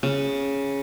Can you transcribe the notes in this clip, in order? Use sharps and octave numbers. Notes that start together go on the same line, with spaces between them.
C#3